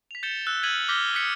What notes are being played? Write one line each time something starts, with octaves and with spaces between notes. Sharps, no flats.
B6 F7
G6 A6 C#7 E7 G7
E6 F#6
F6 G#6 B6 D#7 F#7
D6 F6 G6 A#6 B6 G7
D#6 F6 F#6 B6 C#7 G7